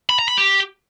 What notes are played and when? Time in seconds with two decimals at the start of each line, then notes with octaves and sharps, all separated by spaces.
0.09 B5
0.19 A#5
0.28 B5
0.38 G4